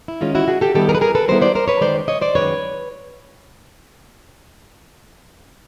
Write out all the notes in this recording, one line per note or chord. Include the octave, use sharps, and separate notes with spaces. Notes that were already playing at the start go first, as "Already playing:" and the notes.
E4
D#3 G#3 C#4 F4
E4 F#4
F#4 G#4
G4 A4
D#3 G3 B3 E4 G4 A4
G#4 A#4
B4
G#4 A#4
A4 B4
D#3 G3 B3 E4 A#4 C5
C5 D5
A#4 C5
B4 C#5
F#2 D#3 G#3 C5 D5
C#5 D#5
C5 D5
F#2 D#3 G#3 B4 C#5